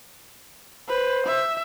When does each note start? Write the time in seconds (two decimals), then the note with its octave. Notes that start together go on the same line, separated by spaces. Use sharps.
0.88 B4 C5
1.26 E5